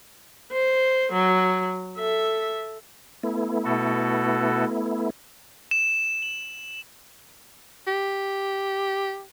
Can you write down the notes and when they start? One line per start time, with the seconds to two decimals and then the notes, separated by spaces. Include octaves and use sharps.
0.52 C5
1.12 F#3
1.98 A4 E5
3.23 A3 B3 E4
3.65 B2 F#4 A4
5.71 E7
6.23 F#7
7.87 G4